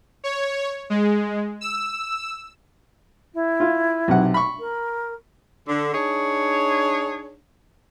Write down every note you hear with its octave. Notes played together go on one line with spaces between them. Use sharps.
C#5
G#3
E6
E4
F4
B1 C3 F#5
B5 C#6
A#4
D3
D4 D#4 G#4 C#5